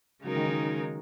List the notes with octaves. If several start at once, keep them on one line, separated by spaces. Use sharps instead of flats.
C#3 F#3 G#3 D#4 A#4
D#3
D#3